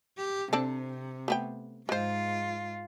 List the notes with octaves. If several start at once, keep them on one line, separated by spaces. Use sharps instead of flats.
G4
C3 C4 D4 A4
A3 B3 G5
G#2 G#3 F4 C5